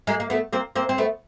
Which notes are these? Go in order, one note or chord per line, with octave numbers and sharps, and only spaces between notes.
G#3 A#3
A#3
A3 B3
A#3 C4
A#3 C4
C4
A3 B3